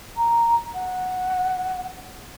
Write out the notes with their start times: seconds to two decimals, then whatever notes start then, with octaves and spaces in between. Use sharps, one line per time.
0.16 A#5
0.74 F#5